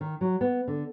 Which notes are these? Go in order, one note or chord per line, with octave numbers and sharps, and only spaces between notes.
D#3
F#3
B3
D3